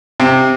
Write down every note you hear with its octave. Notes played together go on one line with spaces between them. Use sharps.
C3